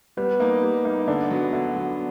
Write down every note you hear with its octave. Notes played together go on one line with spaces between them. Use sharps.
G3 B3 B4
A#3 D#4
G3
A#3 D#4
D3 D4 D5
F#3 B3
D3
F#3 B3